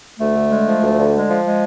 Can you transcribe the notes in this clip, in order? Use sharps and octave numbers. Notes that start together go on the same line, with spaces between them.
D2 A3
D3
G#3
F3
D2
D3
G#3
F3
G#3